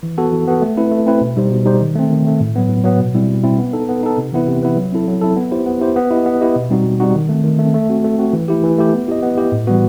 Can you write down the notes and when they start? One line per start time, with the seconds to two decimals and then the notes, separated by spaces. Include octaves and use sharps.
0.03 E3
0.18 B3 F#4 A4
0.32 E3
0.47 B3 F#4 A4
0.61 A3
0.77 C4 E4 B4
0.92 A3
1.06 C4 E4 B4
1.21 B2
1.37 G3 D#4 G4 C5
1.51 B2
1.66 G3 D#4 G4 C5
1.81 D#3
1.95 A3 C4
2.10 D#3
2.25 A3 C4
2.40 A2
2.55 F#3 B3
2.69 A2
2.84 F#3 B3
2.99 B2
3.15 G3 C4 E4
3.29 B2
3.44 G3 C4 E4
3.58 B3
3.73 D#4 A4
3.88 B3
4.03 D#4 A4
4.18 C3
4.32 E3 B3 E4 B4
4.48 C3
4.63 E3 B3 E4 B4
4.77 F#3
4.92 C4 E4 A4
5.07 F#3
5.21 C4 E4 A4
5.36 B3
5.51 E4 G4 C5
5.66 B3
5.81 E4 G4 C5
5.96 B3
6.11 E4 G4 D#5
6.26 B3
6.41 E4 G4 D#5
6.56 B2
6.70 G3 C4 D#4 F#4
6.85 B2
7.00 G3 C4 D#4 F#4
7.15 D#3
7.29 A3 C4
7.44 D#3
7.59 A3 C4
7.74 A3
7.89 C4 F#4
8.04 A3
8.19 C4 F#4
8.33 E3
8.48 A3 E4 G4
8.63 E3
8.78 A3 E4 G4
8.93 B3
9.08 E4 G4 D#5
9.22 B3
9.37 E4 G4 D#5
9.52 A2
9.67 E3 G3 B3 F#4